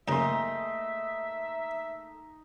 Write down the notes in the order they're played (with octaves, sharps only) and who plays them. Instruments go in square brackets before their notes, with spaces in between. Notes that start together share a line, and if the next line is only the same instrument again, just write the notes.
[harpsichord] F#2 C#3 [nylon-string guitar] A3 A#3 G#4 [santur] D#4 C6 [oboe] E5